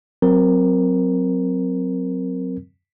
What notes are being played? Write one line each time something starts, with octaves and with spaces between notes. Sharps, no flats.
F#3 C4 A#4